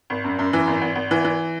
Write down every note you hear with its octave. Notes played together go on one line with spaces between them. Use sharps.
G#1
F#2
F#2
E3
G#1
G#1
G#1
E3
E3